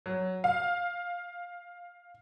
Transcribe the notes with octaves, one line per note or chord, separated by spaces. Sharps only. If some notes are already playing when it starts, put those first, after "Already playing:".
F#3
F5